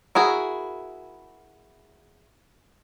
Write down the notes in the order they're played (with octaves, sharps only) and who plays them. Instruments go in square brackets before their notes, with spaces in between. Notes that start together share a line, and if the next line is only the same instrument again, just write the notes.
[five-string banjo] E4 F#4 G#4 A#4